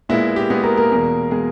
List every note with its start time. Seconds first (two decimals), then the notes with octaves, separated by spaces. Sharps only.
0.09 A#2 G#3 B3 E4 E5
0.36 G4
0.50 A#2 G#3 B3 G#4
0.63 A#3 A#4
0.77 A#3 A#4
0.91 E2 B2 G#3
1.31 B2 G#3 G#4